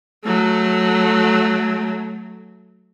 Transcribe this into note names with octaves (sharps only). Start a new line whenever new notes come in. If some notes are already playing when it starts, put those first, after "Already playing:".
F#3 A3